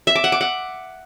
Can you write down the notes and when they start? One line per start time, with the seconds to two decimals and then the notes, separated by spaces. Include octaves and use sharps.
0.07 E5
0.15 D6
0.24 F#5
0.32 D6
0.41 F#5